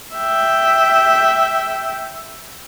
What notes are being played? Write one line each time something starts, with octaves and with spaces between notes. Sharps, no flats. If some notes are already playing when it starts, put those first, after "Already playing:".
E5 G5